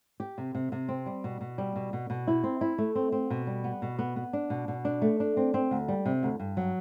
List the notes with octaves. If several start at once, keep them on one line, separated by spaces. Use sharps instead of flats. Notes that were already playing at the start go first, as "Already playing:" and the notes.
G4
C3
C3
C3
C4
G3
B2
B2
G3
B2
B2
B2
E4
C4
E4
A3
C4
C4
B2
G3
B3
B2
B3
B3
D4
B2
B2
D4
A3
D4
C4
C4
D2
G3
C3
D2
G2
F#3